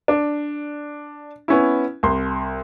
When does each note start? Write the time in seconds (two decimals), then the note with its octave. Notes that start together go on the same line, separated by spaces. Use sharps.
0.08 D4
1.48 B3 C#4 E4
2.03 C2 C6